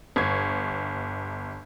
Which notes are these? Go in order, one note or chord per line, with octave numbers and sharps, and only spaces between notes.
G1 C#6 G#6